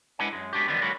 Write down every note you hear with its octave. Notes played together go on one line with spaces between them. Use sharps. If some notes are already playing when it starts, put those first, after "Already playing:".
G#3 D4 E4 B4 F#5 G#5
F#2 G#3
G#3 B3 D4 F#4 G4
D3 D#3 F3 G3 B3 C4
D3 F#3 G#3 A#3 F#4 B5